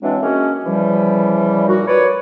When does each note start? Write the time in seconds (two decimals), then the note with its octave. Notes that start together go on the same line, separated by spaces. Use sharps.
0.02 E3 F#3 G#3 C4 D4
0.22 G#3 A#3 C#4 F#4
0.66 C#3 E3 F3 G3
1.68 A#2 A#3 D#4 F#4
1.87 B4 C#5 D5